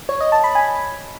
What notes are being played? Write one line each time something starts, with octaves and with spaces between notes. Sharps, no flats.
C#5
D#5
A5
B5
G#5